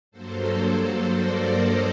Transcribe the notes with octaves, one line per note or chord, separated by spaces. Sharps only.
G2 F#3 A#3 A4 C5
A#4 D5
C5 D#5